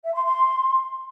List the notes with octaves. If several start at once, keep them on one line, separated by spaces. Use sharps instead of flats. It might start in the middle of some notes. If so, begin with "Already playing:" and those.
E5
C6
C6